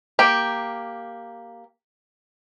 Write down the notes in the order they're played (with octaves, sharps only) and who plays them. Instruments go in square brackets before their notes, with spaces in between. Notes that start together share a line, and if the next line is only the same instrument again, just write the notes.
[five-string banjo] A#3 G4